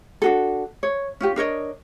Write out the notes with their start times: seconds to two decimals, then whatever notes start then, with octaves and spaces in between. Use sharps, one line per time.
0.22 D4 F#4 A4
0.83 C#5
1.21 C#4 F4 G4
1.36 D4 A#4 C#5 D#5